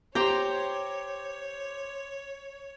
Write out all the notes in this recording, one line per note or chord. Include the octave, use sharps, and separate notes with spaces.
G4 C5 C#5 G5 A#5 C6 D6